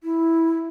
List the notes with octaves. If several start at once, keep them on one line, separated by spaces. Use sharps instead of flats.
E4